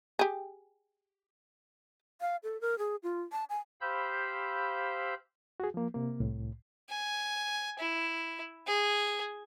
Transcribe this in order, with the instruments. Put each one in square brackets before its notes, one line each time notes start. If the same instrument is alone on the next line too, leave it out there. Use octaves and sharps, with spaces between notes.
[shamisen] G4 G#4
[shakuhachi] F5
A4
A#4
G#4
F4
A5
G#5
[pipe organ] G4 C5 F5 B5 E6 G6
[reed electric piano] F#4 G#4
F3 A#3
C3 A#3
C2 A2
[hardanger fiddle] G#5
E4
G#4